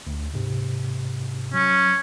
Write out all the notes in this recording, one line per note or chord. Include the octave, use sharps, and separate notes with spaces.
D2
G#2 C3
F#3 C#4